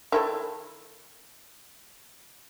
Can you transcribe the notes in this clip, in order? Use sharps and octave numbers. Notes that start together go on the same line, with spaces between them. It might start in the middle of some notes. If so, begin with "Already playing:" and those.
D#3 E4 A4